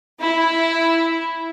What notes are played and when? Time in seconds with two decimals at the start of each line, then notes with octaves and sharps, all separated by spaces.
0.21 E4